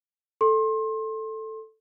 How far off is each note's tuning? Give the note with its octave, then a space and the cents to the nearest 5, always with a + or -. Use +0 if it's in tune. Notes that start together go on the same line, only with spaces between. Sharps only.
A4 +0 C6 +30